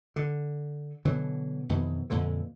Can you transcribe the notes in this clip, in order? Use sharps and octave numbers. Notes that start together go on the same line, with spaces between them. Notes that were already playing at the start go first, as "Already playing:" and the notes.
D3
B2 D3 E3 F#3
F2 B2 D#3 E3
F2 A#2 D3 E3